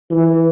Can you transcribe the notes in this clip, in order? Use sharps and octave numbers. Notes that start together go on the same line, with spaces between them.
E3